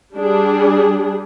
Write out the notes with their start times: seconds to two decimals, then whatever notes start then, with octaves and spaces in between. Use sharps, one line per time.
0.16 G3 D4 G#4